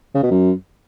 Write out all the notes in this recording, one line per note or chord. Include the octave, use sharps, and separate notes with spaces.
C#3
B2
F#2